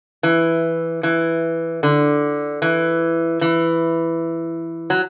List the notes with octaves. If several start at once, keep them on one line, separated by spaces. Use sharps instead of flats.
E3
E3
D3
E3
E3
F#3